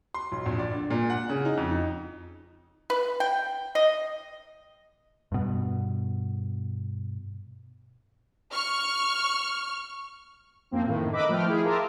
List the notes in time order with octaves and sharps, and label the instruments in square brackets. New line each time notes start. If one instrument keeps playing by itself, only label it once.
[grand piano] C6
B1
A#1
D5
D3
A#2
F#5
C#3
D#4
F2
D#4
[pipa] B4
G5
D#5
[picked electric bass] G2 B2
[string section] C#6 F6
[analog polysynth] F#2 F3 A#3 C4
A2 D#3
A#4 B4 D#5 E5 B5 D6
F3 A3 C5 G5 F6
E4 G#4
F4 A#4 E5 A5 A#5 D6